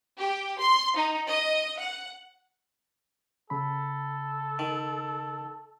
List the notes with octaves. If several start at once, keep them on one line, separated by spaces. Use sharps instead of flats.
G4
C6
D#4
D#5
F#5
C#3 A4 B5
D#3